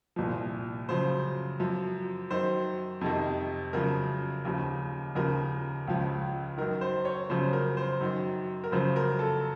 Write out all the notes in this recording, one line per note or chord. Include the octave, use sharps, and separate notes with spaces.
C2 A#2 F3
F#2 C#3 F3 C5
F#2 F3
F#2 D#3 C5
F2 C3 D#3
F#2 C#3 F3 A#4
D#2 C#3 F3
D#2 C#3 F3 A#4
C#2 C#3 F3
F#2 D#3 A#4
C5
C#5
F#2 C#3 F3 C5
A#4
C5
F#2 D#3
A#4
F#2 C#3 F3 C5
A#4
A4